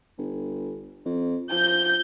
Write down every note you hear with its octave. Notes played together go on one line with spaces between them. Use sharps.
G1
F2
F3 G6